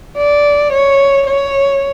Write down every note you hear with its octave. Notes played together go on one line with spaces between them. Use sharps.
D5
C#5
C#5